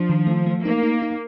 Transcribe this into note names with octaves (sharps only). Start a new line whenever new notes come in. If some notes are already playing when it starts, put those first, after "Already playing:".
Already playing: F3 D4
D#3
A3
A3
A#3 D#4
D#4
D#4